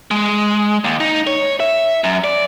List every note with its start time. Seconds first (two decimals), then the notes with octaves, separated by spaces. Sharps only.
0.11 G#3
0.84 D#2
1.00 D#4
1.27 C#5
1.60 E5
2.04 F#2
2.24 D5